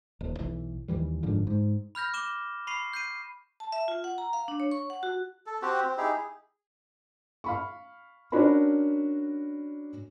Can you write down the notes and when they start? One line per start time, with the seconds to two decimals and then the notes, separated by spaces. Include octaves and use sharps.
0.21 D#1
0.39 B1 E3
0.88 D#2 D#3 E3 G3
1.23 F#1 G#2 D3 F3
1.47 G#2
1.95 B5 F6 G6 A#6
2.14 D6 E7 G7
2.67 B5 C#6 C7 D#7
2.93 G6 C7 D#7
3.60 A5
3.72 E5
3.88 F4
4.04 F#5
4.18 A#5
4.33 F5
4.48 D4
4.60 C#5
4.71 C#6
4.90 F#5
5.03 F#4
5.46 A4
5.62 C4 F#4 G4
5.83 C4
5.98 D#4 E4 G4 G#4
6.12 G#4
7.44 F5 B5 C#6
8.32 C#4 D4 F#4 A#4 B5